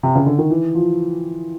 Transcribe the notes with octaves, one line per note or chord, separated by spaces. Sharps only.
C3
C#3
D3
D#3
E3
F3